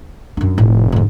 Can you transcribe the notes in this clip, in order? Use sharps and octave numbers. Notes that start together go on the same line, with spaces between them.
F#2 D4
F1 A2
G#2 D3